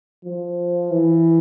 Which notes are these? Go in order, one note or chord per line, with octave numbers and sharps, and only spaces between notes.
F3
E3